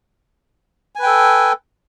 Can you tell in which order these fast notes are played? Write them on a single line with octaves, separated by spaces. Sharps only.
G#5 B4 G5 A4